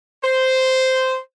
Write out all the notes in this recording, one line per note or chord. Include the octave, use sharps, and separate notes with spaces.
C5